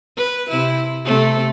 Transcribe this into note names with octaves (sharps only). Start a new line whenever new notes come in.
B4
C3 E4
C3 A3